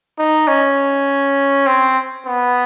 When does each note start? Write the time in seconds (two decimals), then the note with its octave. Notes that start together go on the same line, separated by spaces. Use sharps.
0.18 D#4
0.48 C#4
1.67 C4
2.26 B3